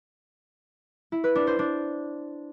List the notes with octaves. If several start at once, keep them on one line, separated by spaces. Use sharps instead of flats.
E4
B4
D4
C5
D4